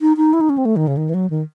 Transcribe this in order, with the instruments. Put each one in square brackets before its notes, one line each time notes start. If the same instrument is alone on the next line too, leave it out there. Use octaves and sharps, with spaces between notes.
[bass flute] D#4
D#4
E4
D#4
C#4
C4
A3
D#3
C#3
D#3
E3
F#3
D#3